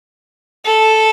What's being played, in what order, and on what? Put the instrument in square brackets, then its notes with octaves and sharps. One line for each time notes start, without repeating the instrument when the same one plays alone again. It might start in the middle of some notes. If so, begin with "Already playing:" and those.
[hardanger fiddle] A4